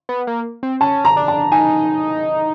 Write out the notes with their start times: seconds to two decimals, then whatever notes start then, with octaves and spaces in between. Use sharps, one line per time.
0.09 B3
0.27 A#3
0.63 C4
0.81 C#4 A5
1.05 A#5
1.17 D4
1.28 A5
1.52 D#4 G#5